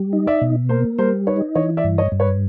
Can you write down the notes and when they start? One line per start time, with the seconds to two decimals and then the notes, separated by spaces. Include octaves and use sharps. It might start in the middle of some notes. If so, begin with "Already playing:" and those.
Already playing: G3
0.13 D#4
0.27 D5 E5
0.41 B2
0.69 A#3 A#4 C5
0.98 G3 A#4 C5
1.27 D#4 B4 C#5
1.55 E3 C#5 D#5
1.77 D5 E5
1.84 G2
1.98 C#5 D#5
2.12 G2
2.20 B4 C#5